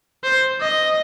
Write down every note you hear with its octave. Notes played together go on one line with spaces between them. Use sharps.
C5
D#5